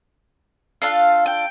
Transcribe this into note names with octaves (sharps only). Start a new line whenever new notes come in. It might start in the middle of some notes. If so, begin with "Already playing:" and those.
D4 F4 A4 F5
G5